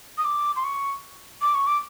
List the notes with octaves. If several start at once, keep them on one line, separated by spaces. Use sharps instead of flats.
D#6
D6
C6
C#6
D6
C#6
D6